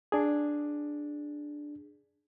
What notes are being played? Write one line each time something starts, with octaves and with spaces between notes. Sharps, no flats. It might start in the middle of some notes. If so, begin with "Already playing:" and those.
D4 G#4